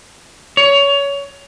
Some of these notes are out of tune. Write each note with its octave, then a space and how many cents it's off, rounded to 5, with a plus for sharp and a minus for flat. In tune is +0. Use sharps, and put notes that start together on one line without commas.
C#5 +20